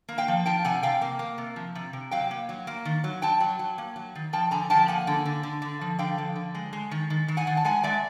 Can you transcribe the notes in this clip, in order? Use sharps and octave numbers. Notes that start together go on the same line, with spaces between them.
A#3
F5 G5
F3
F3 G5 A5
C3 F#5 G#5
C3 F5 G5
A#3
A#3
C3
F3
C3
C3
F#3 F5 G5
A#3
F#3
A#3
D#3
F#3
F#3 G5 A5
F#3
F#3
A#3
F#3
D#3
F3 G5 A5
D3 G#5 A#5
F3 G5 A5
A#3 F#5 G#5
D3
D3
D3
D3
F3
D3 F5 G5
F3
D3
G#3
G#3
D#3
D#3
D#3
F#5 G#5
D#3
A5
G#3 F#5 G#5
G#3 D5 E5